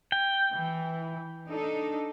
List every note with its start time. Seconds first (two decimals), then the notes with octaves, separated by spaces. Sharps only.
0.12 G5
0.54 E3
1.48 D4 D#4 A4